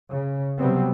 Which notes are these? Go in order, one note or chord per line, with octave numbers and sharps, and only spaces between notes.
C#3
C3 F#3 G3 B3 C4